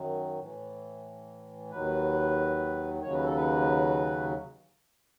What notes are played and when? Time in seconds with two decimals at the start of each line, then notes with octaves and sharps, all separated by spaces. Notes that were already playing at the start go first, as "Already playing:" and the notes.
Already playing: F#2 D#3 F#3
0.39 A2 E3
1.70 D#2 D#3 F#3 B4
3.02 D#2 C#3 F#3 C#5
3.13 B4
3.25 A4
3.36 B4